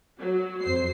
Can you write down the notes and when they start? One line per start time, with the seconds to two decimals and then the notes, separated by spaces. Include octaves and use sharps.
0.19 F#3
0.61 F2 C5 C7